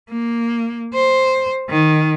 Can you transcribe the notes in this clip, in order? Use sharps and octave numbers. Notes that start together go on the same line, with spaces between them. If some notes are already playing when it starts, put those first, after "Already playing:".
A#3
C5
D#3